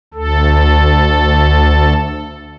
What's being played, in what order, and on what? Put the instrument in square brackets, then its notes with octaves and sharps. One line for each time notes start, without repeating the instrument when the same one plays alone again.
[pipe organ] D2 A4